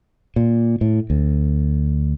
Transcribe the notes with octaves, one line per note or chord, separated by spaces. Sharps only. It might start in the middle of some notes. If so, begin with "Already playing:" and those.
A#2
A2
D2